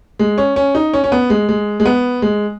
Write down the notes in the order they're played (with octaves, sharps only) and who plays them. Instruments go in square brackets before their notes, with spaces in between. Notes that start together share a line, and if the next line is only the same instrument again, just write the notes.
[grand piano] G#3
C#4
C#4
D#4
C#4
C#4
B3
G#3
G#3
G#3
B3
G#3